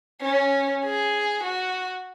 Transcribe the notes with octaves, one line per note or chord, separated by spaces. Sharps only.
C#4
G#4
F#4